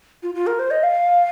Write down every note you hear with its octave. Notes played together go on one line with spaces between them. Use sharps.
F4
F4
A#4
C5
D#5
F5